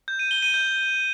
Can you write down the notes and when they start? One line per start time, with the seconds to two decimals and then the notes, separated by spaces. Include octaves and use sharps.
0.08 G6
0.19 D#7
0.31 G7
0.42 D#7
0.54 G6